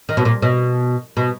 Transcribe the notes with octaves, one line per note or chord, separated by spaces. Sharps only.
D#3
B2
A#2
B2
B2